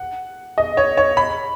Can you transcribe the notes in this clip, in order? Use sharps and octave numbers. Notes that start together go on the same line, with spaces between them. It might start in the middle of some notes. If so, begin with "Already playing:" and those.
Already playing: F#5
D#5
C#5
C#5
B5